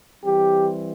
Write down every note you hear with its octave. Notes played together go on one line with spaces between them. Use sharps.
E3 G3 C4 G4